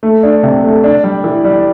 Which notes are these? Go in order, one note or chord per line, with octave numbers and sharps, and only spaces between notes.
A3
D4
C3
A3
D4
G3
E3
G3